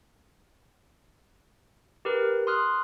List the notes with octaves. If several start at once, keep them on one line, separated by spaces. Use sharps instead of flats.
G4 A#4 B4
C6 D#6 F6 F#6